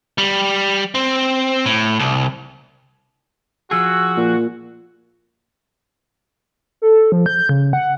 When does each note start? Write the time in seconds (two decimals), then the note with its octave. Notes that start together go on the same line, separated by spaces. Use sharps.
0.18 G3
0.95 C4
1.66 A2
1.99 C2
3.71 F3 F#4 G#4 E6
4.17 A#2
6.82 A4
7.12 F3
7.26 G6
7.49 C#3
7.73 F#5